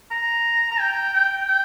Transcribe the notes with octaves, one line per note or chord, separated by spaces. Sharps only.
A#5
A#5
G5
G5
G5